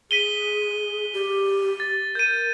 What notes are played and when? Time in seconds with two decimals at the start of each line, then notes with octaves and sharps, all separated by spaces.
0.11 G#4 B6 D#7 G7
1.14 G4
1.80 A6
2.15 A#4 G6 D#7